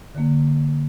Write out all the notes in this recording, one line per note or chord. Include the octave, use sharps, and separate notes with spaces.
D3 A#3